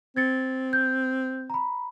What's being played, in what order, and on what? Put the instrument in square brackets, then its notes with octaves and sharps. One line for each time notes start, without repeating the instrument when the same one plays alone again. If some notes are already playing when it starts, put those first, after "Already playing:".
[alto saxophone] C4 [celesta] G#6 A6 C#7
[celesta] G6
A#5 B5